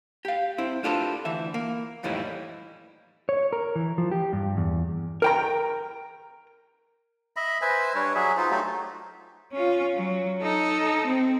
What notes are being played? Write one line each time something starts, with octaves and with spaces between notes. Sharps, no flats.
G4 F5
C4 E4
D4 F4 G4 A4 B4 C5
D2 E3 E5
A#3
F2 A2 E3 G3 D#4 E4
C#5
A#4
E3
F3
G4
G2
E2
A#4 G5 A#5
D#5 E5 B5
B4 C5 E5 G#5
G3 D4 B4 C#5
F#3 G#4 E5
D#4 F4 C5
F#3 A3 D#4 G4
C#4 F4
F#3
D#4 A4
C4